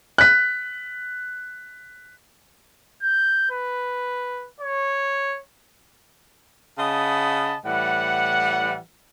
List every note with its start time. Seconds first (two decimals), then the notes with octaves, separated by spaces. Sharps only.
0.18 F#6 B6
3.03 G6
3.51 B4
4.60 C#5
6.78 C#3 D#5 F#5 A5 B5
7.66 A2 E3 G3 F#5